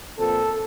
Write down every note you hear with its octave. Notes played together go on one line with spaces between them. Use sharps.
A#2 F3 C4 A4